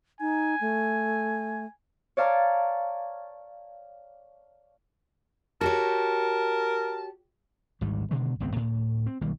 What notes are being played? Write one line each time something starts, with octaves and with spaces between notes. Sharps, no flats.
D#4 G#5
A3
C#5 D5 F5 A5 A#5 D6
F#4 G4 A#4 C#5 A5
G#1 D2 G#2 G3
B2 D3 D#3 G#3
G#1 C#2 B3 C4
D2 A2
C4
B1 D#3 G3 A#3